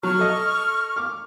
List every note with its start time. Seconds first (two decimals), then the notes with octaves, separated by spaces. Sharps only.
0.03 F#3 C#6 F6
0.19 A4 D#5
0.96 D6 F6